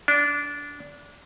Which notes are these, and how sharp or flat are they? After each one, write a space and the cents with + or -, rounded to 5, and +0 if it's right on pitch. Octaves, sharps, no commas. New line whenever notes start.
D4 -20